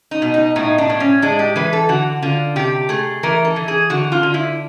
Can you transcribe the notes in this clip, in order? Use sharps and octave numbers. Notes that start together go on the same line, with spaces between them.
D#4
B2
D#4
A2 D#4
D4
A2
C#4
G#3 D4
G4
E3 B4
A4
D3 F#4
D3 F4
C3 G4
A3 G#4
E3 A#4
A4
E3
G#4
D3 F#4
F4
D3
E4